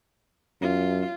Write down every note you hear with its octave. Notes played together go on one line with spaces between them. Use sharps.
F#2 F4